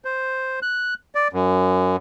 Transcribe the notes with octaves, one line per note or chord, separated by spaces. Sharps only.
C5
F#6
D5
F#2